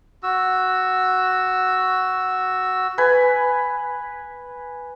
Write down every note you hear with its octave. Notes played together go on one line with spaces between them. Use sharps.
F#4 E6
B4 G#5